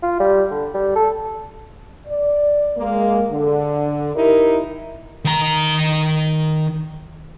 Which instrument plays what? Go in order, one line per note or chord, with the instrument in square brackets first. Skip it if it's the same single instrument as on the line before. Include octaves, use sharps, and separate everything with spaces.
[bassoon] F4
G3
D3
G3
A4
[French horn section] D5
G#3 A#3
D3
D#4 E4 G4 A#4
[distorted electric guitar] D#3 A#5